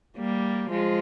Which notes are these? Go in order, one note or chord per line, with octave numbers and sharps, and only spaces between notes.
G3 A#3
F3 G#3